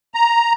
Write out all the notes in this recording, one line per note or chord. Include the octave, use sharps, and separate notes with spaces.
A#5